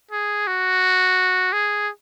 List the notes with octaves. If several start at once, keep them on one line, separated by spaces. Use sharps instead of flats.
G#4
F#4
G#4